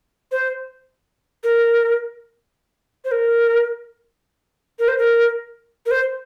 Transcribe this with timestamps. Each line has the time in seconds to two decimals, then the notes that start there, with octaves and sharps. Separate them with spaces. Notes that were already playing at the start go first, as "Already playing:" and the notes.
0.32 C5
1.44 A#4
3.05 C5
3.11 A#4
4.79 A#4
4.88 C5
4.98 A#4
5.86 A#4
5.91 C5